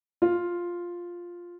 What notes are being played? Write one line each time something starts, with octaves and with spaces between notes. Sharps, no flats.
F4